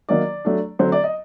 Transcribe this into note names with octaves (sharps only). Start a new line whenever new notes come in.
D#3 F#3 A#3 D#4 D5
F#3 A3 D4
D3 F#3 A3 C4 C5
D5
D#5